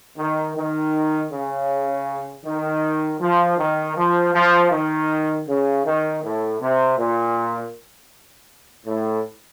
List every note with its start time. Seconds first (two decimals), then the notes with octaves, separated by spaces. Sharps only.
0.18 D#3
0.55 D#3
1.32 C#3
2.45 D#3
3.20 F3
3.58 D#3
3.96 F3
4.34 F3
4.71 D#3
5.48 C#3
5.84 D#3
6.23 A2
6.60 C3
6.98 A#2
8.86 A2